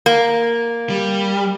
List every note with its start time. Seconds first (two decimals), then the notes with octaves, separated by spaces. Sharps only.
0.06 A#3
0.90 G3